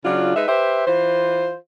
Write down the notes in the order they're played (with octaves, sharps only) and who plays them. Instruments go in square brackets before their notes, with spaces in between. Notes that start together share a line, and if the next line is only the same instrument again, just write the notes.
[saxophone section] C#3 F#3 D4 F4
G#3 D#4 B4 E5
G4 B4 C5 E5
E3 F4 C5